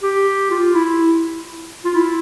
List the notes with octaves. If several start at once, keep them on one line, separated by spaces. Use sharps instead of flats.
G4
F4
E4
F4
E4